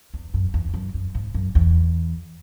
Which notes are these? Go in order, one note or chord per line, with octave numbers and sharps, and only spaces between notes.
E2
F#2
E2
F#2
F#2
G#2
F#2
E2